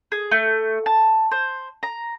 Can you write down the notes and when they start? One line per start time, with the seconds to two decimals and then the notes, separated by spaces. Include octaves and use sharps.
0.12 G#4
0.31 A3
0.86 A5
1.31 C5
1.83 A#5